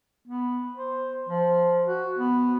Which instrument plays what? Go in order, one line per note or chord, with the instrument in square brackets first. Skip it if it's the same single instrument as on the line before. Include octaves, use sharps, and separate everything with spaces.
[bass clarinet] B3
C5
F3
F#4
B3